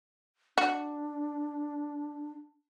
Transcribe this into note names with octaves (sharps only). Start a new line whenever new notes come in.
D4 F#4